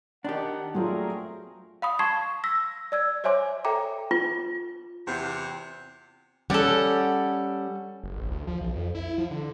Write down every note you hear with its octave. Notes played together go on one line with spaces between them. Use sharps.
D#3 D4 G4 F#5
A#2 F#3 A3 C4 F4 G#4 A#4
F5 B5 D#6
A5 C6 C#6 G#6 C7 E7
E6 A#6 B6
D5 E6 G#6
C5 C#5 E5 G#5 C6 D6
A4 E5 G5 A#5 D6
F4
E2 C3
G3 C#4 A4 D5 F#5
F#1
A1
D2
F3
B1
F2
E4
F3
D3